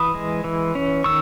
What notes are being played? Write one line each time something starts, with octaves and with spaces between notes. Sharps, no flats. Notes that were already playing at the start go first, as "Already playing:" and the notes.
Already playing: E3 B5 D#6
G#3
E3
C#4
D#3 C#6 E6